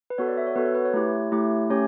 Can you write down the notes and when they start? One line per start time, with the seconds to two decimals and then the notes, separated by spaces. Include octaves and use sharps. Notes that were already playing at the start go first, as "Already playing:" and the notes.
0.10 B4
0.18 B3 F#4 A4 C#5
0.28 D5
0.37 E5
0.46 C#5
0.56 B3 F#4 A4 B4
0.65 C#5
0.75 B4
0.85 C#5
0.94 A3 E4 G4
1.32 A3 E4 G4
1.70 A3 C#4 G4 C#5